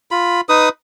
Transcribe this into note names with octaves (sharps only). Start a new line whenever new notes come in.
F4 B5
D#4 B4 D#6